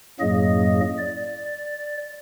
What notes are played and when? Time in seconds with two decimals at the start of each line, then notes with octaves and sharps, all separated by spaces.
0.20 F#2 A2 F#3 A#3 G#4 D#5
0.98 D5